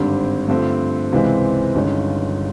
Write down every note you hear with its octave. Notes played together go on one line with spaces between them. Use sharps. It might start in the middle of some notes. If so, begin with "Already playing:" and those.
Already playing: G#1 G2 D3 G3 C4
G2 D3 F3 A3 C4
C#2 C3 E3 G#3 C4
G1 G2 D#3 G#3 C#4